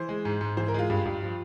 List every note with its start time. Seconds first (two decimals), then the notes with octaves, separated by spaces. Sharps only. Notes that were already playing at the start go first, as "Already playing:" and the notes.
Already playing: E3 C5
0.09 G#3
0.25 G#2
0.41 G#2
0.57 E3 C5
0.68 A#4
0.74 G#3 F4
0.90 G2
1.05 G2
1.23 F3